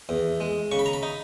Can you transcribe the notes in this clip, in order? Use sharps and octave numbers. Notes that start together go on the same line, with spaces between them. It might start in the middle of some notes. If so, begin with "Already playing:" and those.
E2
G#3
C#3 C#6
B5
A#5
B5
D#4